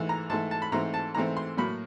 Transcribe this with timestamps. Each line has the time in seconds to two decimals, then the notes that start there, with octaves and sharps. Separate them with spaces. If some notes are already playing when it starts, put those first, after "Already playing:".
Already playing: G#2 E3 A3
0.09 A#5
0.30 G#2 E3 A3 A5
0.51 A5
0.62 B5
0.72 G#2 E3 A3 C4 A#5
0.94 A5
1.15 G#2 E3 A3 C4 A#5
1.37 C6
1.57 A2 F#3 A#3 B5